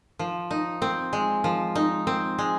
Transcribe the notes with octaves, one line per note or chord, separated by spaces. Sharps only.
F3
D#4
C4
G#3
F3
D#4
C4
G#3